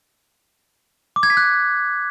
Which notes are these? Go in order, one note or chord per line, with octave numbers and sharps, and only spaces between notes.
D6
G#6
B6
F#6